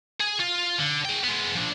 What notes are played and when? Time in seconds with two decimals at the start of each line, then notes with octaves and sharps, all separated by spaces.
0.21 G#4
0.40 F4
0.78 D3
1.05 G#4 G5
1.24 G#3 B3
1.55 F3 D4